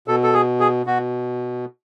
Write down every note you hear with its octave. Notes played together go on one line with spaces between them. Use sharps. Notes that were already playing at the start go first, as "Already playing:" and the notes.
B2 A4
A4
G#4
G#4
B2 F#4